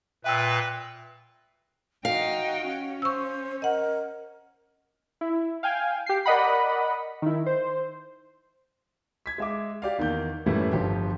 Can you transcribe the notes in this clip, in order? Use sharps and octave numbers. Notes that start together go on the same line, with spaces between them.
A#2 B4 E5 G5 E6
D#4 F#4 F5 G5
C#4
C5 C#6 E6
A#4 D#5 F#5
E4
F5 G5 G#5
G4 C7
A#4 D5 D#5 F#5 B5
D#3 E4
C5
G#6 B6
G#3 E5 D6
G4 D5 F5
E2 D#3 A#3 G6
F#2 A2 E3 G3 A3 E4
G1 F3 G4